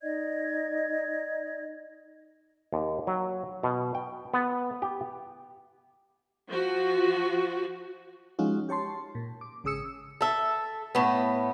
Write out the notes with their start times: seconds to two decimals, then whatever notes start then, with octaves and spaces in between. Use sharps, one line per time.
0.02 D#4 D5 D#5 G#6
2.73 D#2
3.07 F#3
3.63 B2
3.95 G5
4.34 B3
4.82 G4
6.49 F3 F#4
8.39 F3 G#3 C#4 D#4 F4 F#4
8.69 G4 C#5 A5 C6
9.15 A#2
9.41 D6
9.64 G#1 C#3 G#4 D#6 E6 C#7
10.21 A4 E5
10.95 A2 B3